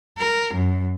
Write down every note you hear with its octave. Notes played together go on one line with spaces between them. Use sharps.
A#4
F#2